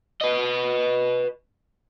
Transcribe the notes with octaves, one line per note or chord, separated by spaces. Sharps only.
B4 D#5